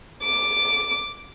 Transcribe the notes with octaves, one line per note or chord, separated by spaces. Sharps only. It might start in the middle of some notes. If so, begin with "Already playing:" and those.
D6